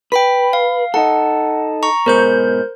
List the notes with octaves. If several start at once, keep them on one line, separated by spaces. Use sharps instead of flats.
B4 G5 B5 B6
F5
D#4 A4 F#5
A#5 C#6
G#2 B2 A#4 C5 G6